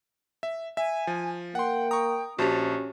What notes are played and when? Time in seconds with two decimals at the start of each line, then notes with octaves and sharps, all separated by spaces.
0.43 E5
0.77 E5 G#5
1.07 F3
1.55 A#3 F#5 G5 C6
1.91 A#5 C#6 D#6
2.39 A#1 C#4 F#4 G4 C5 A5 C#6